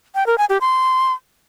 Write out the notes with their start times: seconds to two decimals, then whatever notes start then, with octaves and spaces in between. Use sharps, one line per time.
0.15 G5
0.27 A#4
0.38 G#5
0.49 G4
0.61 C6